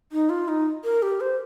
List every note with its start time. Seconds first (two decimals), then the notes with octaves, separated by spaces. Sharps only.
0.12 D#4
0.30 F4
0.48 D#4
0.84 A#4
1.02 G4
1.21 C5